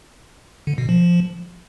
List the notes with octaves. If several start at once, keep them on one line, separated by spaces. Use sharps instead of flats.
D3
B2
F3